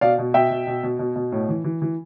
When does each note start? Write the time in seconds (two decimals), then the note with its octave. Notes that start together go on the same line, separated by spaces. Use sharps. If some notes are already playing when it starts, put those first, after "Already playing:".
0.01 B2 D5 F5
0.18 B2
0.34 B2 E5 G5
0.50 B2
0.67 B2
0.83 B2
0.99 B2
1.16 B2
1.32 A2
1.49 E3
1.64 E3
1.82 E3